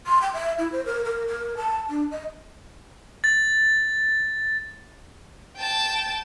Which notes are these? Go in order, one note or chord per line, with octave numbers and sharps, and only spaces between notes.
C6
G5
E5
E4
C5
A#4
A#4
A#4
A5
D4
D#5
A6
G5 A5